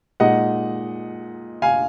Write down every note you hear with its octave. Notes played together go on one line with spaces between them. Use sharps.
A#2 G#3 D#4 D#5 F#5
F5 G#5